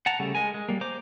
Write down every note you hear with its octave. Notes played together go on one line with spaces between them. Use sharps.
F#5 A5 A#5
C#3 G3 A3
G#3 A#4 G#5
G#3
G3 A#3
C5 A#5 D6